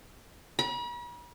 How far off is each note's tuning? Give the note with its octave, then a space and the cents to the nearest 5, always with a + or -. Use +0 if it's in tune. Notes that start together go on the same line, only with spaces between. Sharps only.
B5 -45